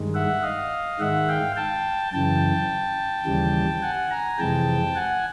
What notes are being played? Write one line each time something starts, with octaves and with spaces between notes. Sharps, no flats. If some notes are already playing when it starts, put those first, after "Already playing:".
Already playing: G2 D#3 G#3
E5 F#5
D#5 F5
G#2 D#3 G#3 E5 F#5
F5 G5
G5 A5
F#2 C#3 E3 G5 A5
D#2 C#3 E3 G3
F#5 G#5
G#5 A#5
F2 C3 E3 G#3 G5 A5
F#5 G#5